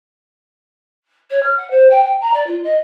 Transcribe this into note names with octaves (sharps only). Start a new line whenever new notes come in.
C#5
F6
F#5
C5
G5
G5
A#5
D5
F4
D#5